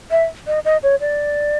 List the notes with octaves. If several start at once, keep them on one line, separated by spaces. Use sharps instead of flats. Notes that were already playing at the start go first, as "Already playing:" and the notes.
E5
D#5
D#5
C#5
D5